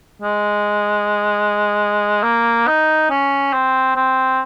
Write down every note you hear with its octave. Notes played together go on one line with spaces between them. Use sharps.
G#3
A#3
D#4
C#4
C4
C4